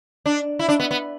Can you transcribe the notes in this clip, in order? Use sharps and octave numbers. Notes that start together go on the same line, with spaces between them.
D4
E4
D4
B3
B3